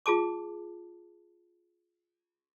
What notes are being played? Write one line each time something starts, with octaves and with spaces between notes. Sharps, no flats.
F4 G#4 A5 D6